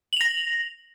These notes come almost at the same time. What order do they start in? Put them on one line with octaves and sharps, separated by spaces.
F#7 F7 A#6